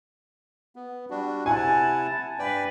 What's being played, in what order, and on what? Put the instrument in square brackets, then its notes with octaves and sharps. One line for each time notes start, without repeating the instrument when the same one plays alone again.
[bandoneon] B3
G3 D4 F#4
[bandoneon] C3 E4 F#5 [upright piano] G#5 [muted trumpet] A5
[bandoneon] G2 D5 G5 [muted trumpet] B4